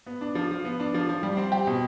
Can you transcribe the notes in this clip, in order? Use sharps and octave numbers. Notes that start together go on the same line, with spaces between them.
B3
D4
F3
F3
B3
D4
F3
F3
G3
C4
G4
B2